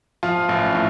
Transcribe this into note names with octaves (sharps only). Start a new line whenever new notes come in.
F3 F4
A1
A2